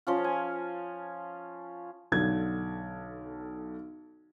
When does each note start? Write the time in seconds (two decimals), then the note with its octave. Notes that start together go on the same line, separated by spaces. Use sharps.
0.07 F3 C#4 F4
0.24 G#5
2.12 B1 D3 G#6